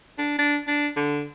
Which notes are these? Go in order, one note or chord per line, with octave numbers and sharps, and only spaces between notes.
D4
D4
D4
D3